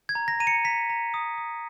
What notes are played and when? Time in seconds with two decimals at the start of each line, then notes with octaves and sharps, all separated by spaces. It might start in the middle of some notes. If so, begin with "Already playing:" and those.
0.09 G#6
0.15 A#5
0.28 A#6
0.40 A#5 D#7
0.47 C#7
0.64 A#5 B6
0.90 A#5
1.14 D#6
1.38 D#6